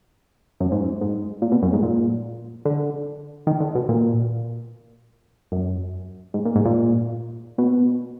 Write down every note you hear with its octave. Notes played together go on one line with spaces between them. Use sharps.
F#2
G#2
F#2
G#2
A#2
B2
F#2
G#2
A#2
D3
D#3
D3
B2
A#2
F#2
G#2
A#2
G#2
A#2
B2